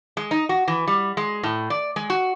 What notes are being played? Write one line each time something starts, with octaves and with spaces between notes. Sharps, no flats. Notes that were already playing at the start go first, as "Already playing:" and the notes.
G#3
D#4
F#4
E3
G3
G#3
A2
D5
G#3
F#4